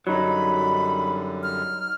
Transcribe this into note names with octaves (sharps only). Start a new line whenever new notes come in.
F#2 D3 F#3 G3 D#4 B5
F6